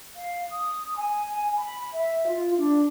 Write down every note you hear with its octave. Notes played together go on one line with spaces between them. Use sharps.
F5
D#6
G#5
B5
E5
F4
D4